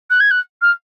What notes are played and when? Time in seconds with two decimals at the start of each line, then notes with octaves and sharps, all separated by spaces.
0.10 F#6
0.20 G#6
0.31 F#6
0.62 F6